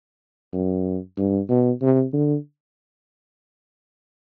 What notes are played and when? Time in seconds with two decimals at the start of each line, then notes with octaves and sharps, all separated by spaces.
0.53 F#2
1.17 G2
1.49 B2
1.81 C3
2.13 D3